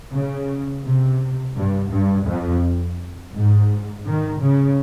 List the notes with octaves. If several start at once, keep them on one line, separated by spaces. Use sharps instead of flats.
C#3
C3
G2
G2
F2
G#2
D#3
C#3